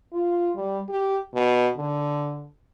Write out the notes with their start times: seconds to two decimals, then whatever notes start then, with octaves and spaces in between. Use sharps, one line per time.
0.13 F4
0.56 G3
0.89 G4
1.34 B2
1.77 D3